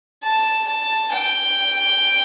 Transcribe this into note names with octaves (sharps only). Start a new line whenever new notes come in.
A5
A5
G5